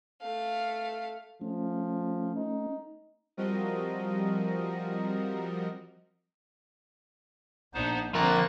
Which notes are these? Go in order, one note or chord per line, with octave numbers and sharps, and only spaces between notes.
A3 F5
F3 A3 C#4
D#4
F3 G3 C4 F#4 A#4 D#5
A#1 B3 D4 D#4 C5
D3 F3 A#3 C4 A#4 F#6 A6